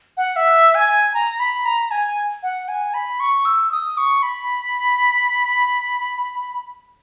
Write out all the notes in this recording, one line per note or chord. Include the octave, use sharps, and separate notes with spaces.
F#5
E5
G#5
A#5
B5
A#5
G#5
F#5
G#5
B5
C#6
E6
D#6
C#6
B5